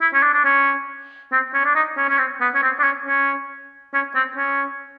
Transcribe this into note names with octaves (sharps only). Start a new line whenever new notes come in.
E4
C#4
D4
D4
C#4
C4
C#4
D4
D#4
C#4
C#4
C4
B3
C#4
C4
D4
C#4
C#4
C#4
C4
C#4